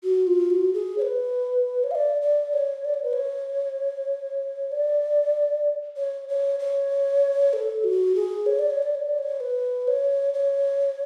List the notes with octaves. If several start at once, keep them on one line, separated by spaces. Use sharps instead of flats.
F#4
F4
F#4
G#4
C#5
B4
C#5
F5
D5
D5
C#5
D5
C#5
B4
C#5
D5
C#5
C#5
C#5
A4
F#4
G#4
C#5
D5
C#5
D5
C#5
D5
C#5
B4
C#5
C#5